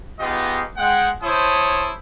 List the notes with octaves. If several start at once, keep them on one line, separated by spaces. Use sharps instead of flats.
B3 D#4 F4 G4 G#4 D#5
G#3 F#5 G5
E4 C5 C#5 A5 D#6